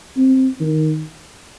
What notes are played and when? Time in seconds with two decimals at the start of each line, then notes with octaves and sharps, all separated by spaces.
0.17 C4
0.61 D#3